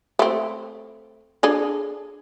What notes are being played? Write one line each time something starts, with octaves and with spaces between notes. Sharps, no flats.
A3 C4
D4 G#4 A4